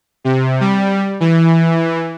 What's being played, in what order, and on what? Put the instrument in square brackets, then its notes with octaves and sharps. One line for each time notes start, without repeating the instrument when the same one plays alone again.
[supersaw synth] C3
G3
E3